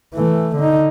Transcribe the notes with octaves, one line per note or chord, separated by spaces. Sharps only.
E3 A3
D3 D#4